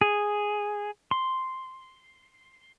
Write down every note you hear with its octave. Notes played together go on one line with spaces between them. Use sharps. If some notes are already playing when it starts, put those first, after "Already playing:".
G#4
C6